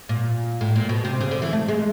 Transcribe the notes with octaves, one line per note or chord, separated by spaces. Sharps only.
A#2
A2
A#2
B2
C3
C#3
D3
E3
A3
G#3